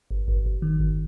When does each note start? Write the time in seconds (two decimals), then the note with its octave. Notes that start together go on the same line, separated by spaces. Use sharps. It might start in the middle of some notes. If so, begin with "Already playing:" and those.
0.11 G1
0.28 G1
0.46 G1
0.62 D#3
0.80 G1